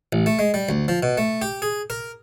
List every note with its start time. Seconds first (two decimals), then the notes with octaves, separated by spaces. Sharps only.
0.13 A1
0.26 A3
0.39 G#3
0.54 G3
0.69 D2
0.88 F3
1.03 B2
1.18 A3
1.42 G4
1.62 G#4
1.90 A#4